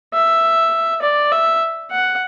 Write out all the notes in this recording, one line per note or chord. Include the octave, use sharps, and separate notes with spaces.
E5
D5
E5
F#5